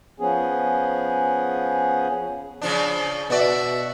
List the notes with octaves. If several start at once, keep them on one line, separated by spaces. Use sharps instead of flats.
F3 B3 C#4 G#4
C#3 F3 D4
B2 F#4 D5 E5